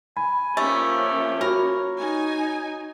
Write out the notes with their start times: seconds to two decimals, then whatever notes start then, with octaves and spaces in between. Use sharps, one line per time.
0.17 G#5 B5
0.57 F3 A3 A#3 C#4 G4
1.41 F#4 A#4 C#5 B5
2.00 D#4 G#5